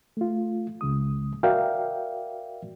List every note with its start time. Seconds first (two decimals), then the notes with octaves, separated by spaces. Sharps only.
0.17 A3 F4
0.81 C#2 C#3 G#3 D#6
1.43 F#4 A#4 D5 E5 F5 G5